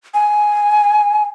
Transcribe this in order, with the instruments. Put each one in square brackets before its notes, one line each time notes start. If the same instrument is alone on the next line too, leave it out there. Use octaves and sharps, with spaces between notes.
[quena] G#5